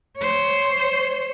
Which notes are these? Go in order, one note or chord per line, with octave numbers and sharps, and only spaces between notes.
C5 C#5